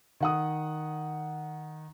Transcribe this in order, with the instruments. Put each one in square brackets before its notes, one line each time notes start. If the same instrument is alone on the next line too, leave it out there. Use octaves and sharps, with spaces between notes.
[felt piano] D#3 F#5 D#6